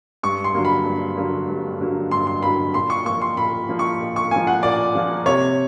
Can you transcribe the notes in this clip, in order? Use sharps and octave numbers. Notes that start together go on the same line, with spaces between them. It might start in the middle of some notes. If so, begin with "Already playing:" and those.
G2 C#6
C6
D3 F#3 A#3
B5
G2
D3 F#3 A#3
G2
D3 F#3 A#3
G2 C6
C6
D3 F#3 A#3 B5
A#2 C6
C#6
F3 A#3 C#6
C6
A#2 B5
F3 A#3
C#6
A#2
C#6
F3 A#3 G#5
F#5
A#2 D5
F3 A#3
C3 C#5